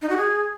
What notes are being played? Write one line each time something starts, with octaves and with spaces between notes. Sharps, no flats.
D#4
F#4
G#4